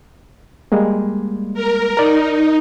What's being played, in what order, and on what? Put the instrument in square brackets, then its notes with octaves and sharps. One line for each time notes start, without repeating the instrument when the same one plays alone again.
[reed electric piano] G3 G#3 A#3
[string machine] A#4
[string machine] D#4 [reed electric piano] A#4 D5